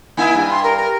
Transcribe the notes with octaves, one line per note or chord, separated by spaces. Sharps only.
A#3 D#4 E4 G#5
G2
C6
A#4
A#4